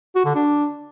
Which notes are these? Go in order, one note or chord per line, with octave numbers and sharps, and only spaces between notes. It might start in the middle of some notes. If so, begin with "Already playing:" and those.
F#4
D3
D4